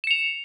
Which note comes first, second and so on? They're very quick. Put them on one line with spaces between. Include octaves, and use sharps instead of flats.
E7 C#7 F7